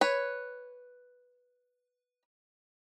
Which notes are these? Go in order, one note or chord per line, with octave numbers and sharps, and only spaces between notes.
B4 C#5